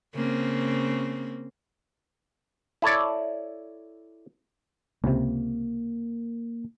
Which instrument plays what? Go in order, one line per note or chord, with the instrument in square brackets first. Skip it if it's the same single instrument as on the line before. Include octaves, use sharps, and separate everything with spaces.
[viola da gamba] C#3 A#3 C4
[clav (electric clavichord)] E4 A4 C#5 D5
[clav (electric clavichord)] C#2 C3 [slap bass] A#3